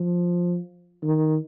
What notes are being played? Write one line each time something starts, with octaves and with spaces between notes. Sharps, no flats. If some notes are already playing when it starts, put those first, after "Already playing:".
Already playing: F3
D#3